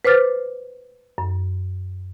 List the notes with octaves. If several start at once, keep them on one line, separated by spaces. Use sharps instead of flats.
B4 C5 D6 F6 A6
F#2